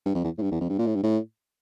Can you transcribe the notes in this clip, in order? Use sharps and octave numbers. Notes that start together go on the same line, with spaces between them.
G2
F2
E2
A2
G2
E2
F2
G2
A#2
A2
G2
A2